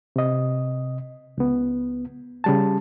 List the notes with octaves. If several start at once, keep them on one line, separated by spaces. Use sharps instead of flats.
C3 D#5
C#2 B3
C#3 G3 A5